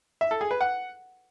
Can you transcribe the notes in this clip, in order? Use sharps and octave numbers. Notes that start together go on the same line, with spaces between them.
E5
A4
G#4
B4
F#5